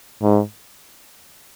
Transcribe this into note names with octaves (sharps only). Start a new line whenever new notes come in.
G#2